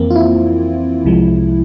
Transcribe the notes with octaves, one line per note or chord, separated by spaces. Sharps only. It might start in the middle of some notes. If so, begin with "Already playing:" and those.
Already playing: F2 E3 A#3 C4
F4
E4
C2 C3 F3 G#3